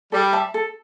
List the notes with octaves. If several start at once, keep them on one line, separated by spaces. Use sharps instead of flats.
G3 A4
E5 A5
A4